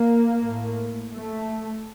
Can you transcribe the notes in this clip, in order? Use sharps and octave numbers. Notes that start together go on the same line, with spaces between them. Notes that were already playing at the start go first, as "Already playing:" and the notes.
Already playing: A#3
A2
A3